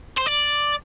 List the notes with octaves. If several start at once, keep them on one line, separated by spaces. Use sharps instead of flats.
C5
D5